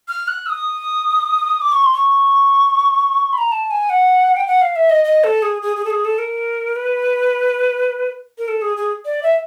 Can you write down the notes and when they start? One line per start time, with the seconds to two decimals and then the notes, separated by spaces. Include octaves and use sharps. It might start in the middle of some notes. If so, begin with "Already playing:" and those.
0.08 F6
0.28 F#6
0.46 E6
0.50 D#6
1.61 D6
1.72 C#6
1.83 C6
1.93 C#6
3.33 B5
3.38 A#5
3.52 A5
3.71 G#5
3.90 F#5
4.36 G5
4.47 F#5
4.61 F5
4.76 E5
4.90 D#5
5.04 D#5
5.24 A4
5.42 G#4
5.62 G#4
5.76 G#4
5.85 A4
5.90 G#4
6.05 A4
6.18 A#4
6.76 B4
8.38 A#4
8.48 A4
8.62 G#4
8.77 G#4
9.05 D5
9.23 E5